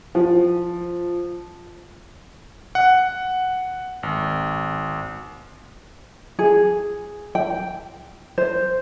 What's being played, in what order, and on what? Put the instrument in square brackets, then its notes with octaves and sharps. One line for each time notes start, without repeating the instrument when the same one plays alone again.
[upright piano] F3
[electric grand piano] F#5
G#1
[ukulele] G#4
G5
C5